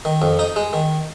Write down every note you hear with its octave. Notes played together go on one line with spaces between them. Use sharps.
D#3
F2
D#4
G#3
D#3